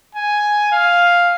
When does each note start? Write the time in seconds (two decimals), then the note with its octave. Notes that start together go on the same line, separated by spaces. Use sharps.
0.15 G#5
0.72 F5